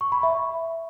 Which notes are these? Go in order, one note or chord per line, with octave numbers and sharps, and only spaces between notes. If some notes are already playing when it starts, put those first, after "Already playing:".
C#6
B5
E5